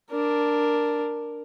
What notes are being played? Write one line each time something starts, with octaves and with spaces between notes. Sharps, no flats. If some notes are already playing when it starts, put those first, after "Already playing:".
D4 A#4